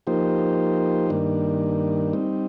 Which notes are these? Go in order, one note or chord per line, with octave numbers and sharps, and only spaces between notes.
F3 A#3 D#4 G4 C5
G2 D#3 A#3 D4
G3 C4 D#4